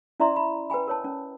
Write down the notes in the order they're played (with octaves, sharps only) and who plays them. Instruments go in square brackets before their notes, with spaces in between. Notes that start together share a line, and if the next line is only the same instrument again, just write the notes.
[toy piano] C#4 E4 D5 E5 A#5 C6
B5
B4 G5 G#5 B5
A#4 C#5 A5
C#4